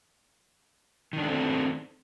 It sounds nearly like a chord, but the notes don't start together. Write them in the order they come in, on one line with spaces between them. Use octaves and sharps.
D#3 D4 A3 C4